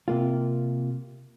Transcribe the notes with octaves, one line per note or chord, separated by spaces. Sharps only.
C3 A#3 F4